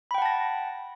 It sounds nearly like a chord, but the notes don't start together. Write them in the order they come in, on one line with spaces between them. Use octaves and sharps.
B5 G5 F#5 A5 A#6